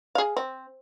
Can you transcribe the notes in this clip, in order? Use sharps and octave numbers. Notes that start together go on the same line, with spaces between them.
G#4 F5
C4